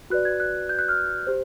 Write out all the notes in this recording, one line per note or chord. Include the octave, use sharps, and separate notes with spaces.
F#4 B4 D5 F#6
G#6
F#6
G6
F#6
F6
G4 C5